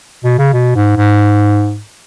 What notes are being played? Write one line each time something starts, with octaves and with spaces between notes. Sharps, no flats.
B2
C#3
B2
G#2
G#2